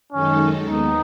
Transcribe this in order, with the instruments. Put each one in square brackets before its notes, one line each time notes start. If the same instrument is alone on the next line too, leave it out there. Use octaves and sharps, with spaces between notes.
[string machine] F#2 D#3 G#3 D#4 A4 [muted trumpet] C#4
[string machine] D#2 D#3 G#3 B3 [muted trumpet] D#4